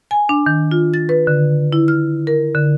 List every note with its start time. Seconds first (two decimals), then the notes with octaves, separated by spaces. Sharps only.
0.11 G#5
0.29 D4
0.46 D#3
0.71 F4
0.94 A6
1.09 B4
1.27 D3
1.72 E4
1.88 F6
2.27 A#4
2.55 D3